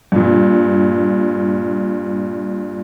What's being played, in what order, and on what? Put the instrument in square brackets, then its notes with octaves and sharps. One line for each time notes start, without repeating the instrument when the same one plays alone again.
[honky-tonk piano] G2 A#2